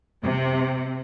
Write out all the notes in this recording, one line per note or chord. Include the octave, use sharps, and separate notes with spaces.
C3